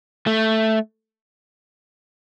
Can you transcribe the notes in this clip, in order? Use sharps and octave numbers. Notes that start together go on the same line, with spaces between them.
A3